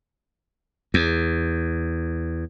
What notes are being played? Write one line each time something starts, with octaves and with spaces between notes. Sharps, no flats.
E2